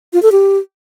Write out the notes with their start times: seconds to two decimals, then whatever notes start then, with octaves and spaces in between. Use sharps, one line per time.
0.13 F4
0.22 A4
0.32 G4